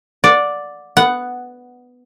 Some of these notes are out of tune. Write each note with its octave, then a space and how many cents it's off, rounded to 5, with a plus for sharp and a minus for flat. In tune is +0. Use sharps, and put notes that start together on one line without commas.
D5 +0 F#5 -25
B3 +5 F#5 +0